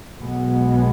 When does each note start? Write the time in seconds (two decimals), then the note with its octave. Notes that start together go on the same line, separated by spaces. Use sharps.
0.20 B1 B2 G#3 B3